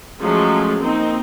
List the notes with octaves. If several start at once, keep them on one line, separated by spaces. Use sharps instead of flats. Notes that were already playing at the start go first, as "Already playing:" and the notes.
F3 F#3 G#3 A3 C#4
A#3 C4 D#4